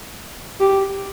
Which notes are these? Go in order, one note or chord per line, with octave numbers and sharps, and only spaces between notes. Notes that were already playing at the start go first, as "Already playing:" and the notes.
G4